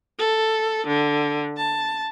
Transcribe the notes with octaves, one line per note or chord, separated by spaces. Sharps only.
A4
D3
A5